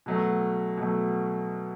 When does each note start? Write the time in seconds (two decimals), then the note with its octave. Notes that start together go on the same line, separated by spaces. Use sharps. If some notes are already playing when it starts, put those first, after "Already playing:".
0.06 B2 F#3 A3
0.77 B2 F#3 A3